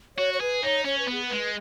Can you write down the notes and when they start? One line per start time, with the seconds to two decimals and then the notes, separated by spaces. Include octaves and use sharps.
0.17 F#4 C#5
0.34 C#5
0.40 G#4 B4
0.63 D#4 C#5
0.85 C#4 C#5
0.99 B4
1.08 B3 G#4
1.26 G#3 B4